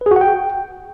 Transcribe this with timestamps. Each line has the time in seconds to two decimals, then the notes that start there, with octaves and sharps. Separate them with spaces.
0.01 B4
0.06 G#4
0.11 F#4
0.16 F#5
0.21 G5